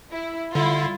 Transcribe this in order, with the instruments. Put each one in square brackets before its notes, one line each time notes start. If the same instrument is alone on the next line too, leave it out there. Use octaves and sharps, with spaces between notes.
[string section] E4
[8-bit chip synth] D3 [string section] G3 E4 F4